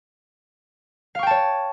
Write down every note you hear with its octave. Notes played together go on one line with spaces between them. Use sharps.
C#5 F5 G5 A5 C#6